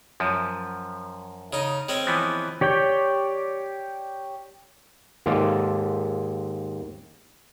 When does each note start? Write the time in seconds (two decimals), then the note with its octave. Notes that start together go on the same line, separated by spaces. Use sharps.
0.20 F#2 F3
1.53 C#3 D#4
1.89 G#3 C4 C#4
2.06 E3 F3 B3
2.61 G4 C#5 D5 G5
5.26 D#2 G#2 F4 A4 D5